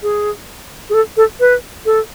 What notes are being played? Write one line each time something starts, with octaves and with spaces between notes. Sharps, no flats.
G#4
G#4
A4
A4
B4
A4